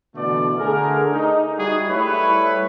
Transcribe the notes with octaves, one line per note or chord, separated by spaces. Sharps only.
B2 D3 E3 A3 D5
D3 A3 G#4 A#4
D#4
G3 D#4 E4 F#4 G#4
G3 A3 E4 B4 C#5